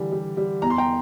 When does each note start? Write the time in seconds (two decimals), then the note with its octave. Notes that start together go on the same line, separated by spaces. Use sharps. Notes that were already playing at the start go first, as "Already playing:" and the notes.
Already playing: D3 E3 G3
0.12 G3
0.37 G3
0.62 E2 A#5
0.70 C6
0.78 G5 A#5